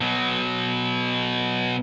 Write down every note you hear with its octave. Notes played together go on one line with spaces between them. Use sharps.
B2 F#3